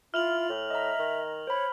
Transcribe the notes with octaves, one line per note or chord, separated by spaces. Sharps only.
E4 F4 F6 F7 F#7
A2
D#5 E5 A#5
D#3
C5 C#5 B5